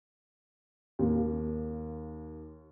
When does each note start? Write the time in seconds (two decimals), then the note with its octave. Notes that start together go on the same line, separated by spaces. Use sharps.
0.99 D#2 A#3